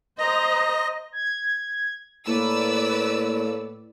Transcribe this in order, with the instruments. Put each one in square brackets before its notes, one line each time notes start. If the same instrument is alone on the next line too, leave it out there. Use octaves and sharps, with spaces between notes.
[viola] C5 A#5 [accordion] D#5
[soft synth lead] G#6
[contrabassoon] A2 [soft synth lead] A#3 [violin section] B4 D5 E6